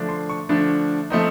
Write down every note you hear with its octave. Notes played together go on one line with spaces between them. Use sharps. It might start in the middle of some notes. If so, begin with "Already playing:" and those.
Already playing: D3 F3 A3 D4
C6
C#6
D3 F3 A3 D4
F3 A3 C4 D#4